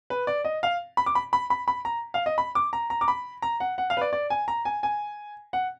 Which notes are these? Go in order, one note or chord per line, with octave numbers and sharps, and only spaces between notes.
B4
D5
D#5
F5
B5
D6
B5
B5
B5
B5
A#5
F5
D#5
B5
D6
A#5
A#5
D6
B5
A#5
F#5
F#5
F5
B4
D5
D5
G#5
A#5
G#5
G#5
F#5